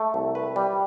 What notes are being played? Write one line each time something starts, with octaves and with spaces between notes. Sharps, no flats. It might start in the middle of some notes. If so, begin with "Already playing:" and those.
Already playing: A3
C2
B4
G3